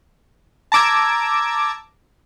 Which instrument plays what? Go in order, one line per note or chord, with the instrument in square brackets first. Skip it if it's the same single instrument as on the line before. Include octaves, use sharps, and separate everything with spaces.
[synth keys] A5 A#5 D6 E6 G#6